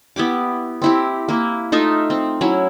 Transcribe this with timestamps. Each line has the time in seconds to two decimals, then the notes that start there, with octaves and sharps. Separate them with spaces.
0.16 B3 E4 G4 D6
0.82 C4 E4 G4
1.29 A#3 E4
1.72 A3 D#4 F4 E5
2.10 C4
2.41 F#3 C#4 E4